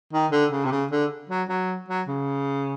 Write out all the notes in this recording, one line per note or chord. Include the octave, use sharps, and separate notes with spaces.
D#3
D3
C#3
C3
C#3
D3
F#3
F#3
F#3
C#3